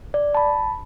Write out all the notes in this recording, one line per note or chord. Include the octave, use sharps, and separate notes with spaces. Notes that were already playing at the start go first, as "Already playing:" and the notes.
D5
A5 B5